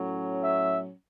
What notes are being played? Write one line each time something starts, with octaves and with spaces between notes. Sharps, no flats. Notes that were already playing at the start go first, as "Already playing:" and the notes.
Already playing: A2 F#3 C#4
E5